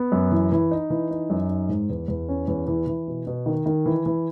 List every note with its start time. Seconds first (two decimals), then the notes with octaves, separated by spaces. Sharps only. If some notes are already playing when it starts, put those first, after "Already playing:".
Already playing: B3
0.12 F#2
0.32 E3
0.52 E3
0.71 D#4
0.90 E3
1.11 D#4
1.30 F#2
1.49 D#4
1.69 G#2
1.90 E2
2.08 E2
2.29 C#4
2.48 E2
2.68 E3
2.87 E3
3.08 B2
3.27 B2
3.46 D#3
3.66 D#3
3.86 E3
4.06 E3